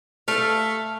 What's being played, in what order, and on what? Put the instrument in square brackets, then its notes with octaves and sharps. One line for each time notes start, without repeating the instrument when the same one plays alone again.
[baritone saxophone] A3 [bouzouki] F5